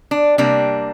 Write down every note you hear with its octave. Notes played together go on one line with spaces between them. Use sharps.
D4
C3 G3 A#3 D4